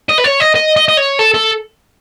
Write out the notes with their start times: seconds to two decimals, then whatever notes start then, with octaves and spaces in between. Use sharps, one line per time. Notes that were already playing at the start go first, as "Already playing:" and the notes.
0.09 D#5
0.18 B4
0.24 C#5
0.40 D#5
0.55 D#5
0.76 D#5
0.88 D#5
0.97 C#5
1.19 A4
1.34 A4